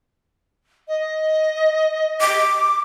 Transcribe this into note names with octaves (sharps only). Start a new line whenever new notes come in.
D#5
D6